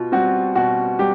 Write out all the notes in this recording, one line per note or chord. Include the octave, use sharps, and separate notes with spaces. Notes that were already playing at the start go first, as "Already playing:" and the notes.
Already playing: B2 F4
G3 C4 F#4
B2 F#4
G3 G4